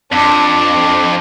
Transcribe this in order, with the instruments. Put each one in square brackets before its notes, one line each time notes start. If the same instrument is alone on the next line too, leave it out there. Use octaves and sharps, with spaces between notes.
[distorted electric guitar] F2 [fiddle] D4